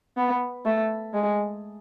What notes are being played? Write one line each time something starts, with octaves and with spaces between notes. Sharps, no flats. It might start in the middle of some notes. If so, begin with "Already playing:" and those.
B3
A3
G#3